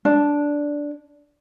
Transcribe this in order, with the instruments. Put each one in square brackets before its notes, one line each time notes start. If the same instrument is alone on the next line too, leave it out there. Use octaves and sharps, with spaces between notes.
[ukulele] D4